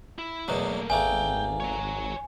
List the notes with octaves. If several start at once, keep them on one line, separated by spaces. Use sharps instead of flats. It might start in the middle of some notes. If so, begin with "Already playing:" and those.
E4
E2 B2 F#3 A3 A#3
G#1 E2 A3 A#3 G5 G#5
C#5 A#5